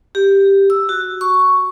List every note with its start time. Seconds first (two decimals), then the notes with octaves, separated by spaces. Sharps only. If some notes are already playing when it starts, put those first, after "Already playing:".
0.15 G4
0.70 E6
0.89 F#4
1.21 C#6